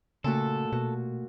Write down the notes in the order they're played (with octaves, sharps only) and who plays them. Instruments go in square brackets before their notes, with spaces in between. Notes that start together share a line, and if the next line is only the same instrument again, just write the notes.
[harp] A#2 A3 F#4 [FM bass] C#3 [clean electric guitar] A4
[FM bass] B2 [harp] F#4